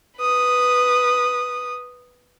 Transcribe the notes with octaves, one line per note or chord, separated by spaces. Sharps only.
B4 D#6